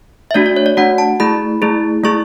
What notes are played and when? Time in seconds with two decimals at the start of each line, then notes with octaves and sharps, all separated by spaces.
0.31 E5
0.34 A3 D4 F#4 D5
0.46 D5
0.56 C#5
0.66 D5
0.77 A3 D4 F#4 F#5
0.98 A5
1.20 A3 E4 G#4 B5
1.62 A3 E4 G#4
2.04 A3 E4 G#4 C#6